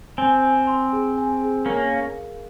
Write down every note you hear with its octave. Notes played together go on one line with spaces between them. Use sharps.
C4 G#5
G#5
C6
G#4
G#5
G#4
A#3 C#4 A#4
F5